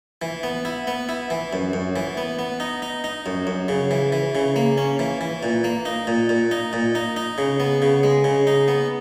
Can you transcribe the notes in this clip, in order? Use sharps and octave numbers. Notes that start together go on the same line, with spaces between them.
E3
B3
E4
B3
E4
E3
F#2
F#2
E3
B3
B3
D#4
D#4
D#4
F#2
F#2
C#3
E3
E3
C#3
A#3
C#4
E3
E3
A#2
A#3
D#4
A#2
A#2
D#4
A#2
D#4
D#4
C#3
B3
C#3
G#3
C#3
D#4
B3